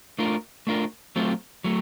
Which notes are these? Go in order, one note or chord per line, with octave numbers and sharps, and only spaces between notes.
A3 D4 F4 A#4
A3 D4 F4 A#4
F#3 A3 C4 F4
F#3 A3